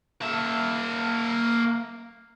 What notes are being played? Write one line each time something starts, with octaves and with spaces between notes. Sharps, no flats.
A#3 E5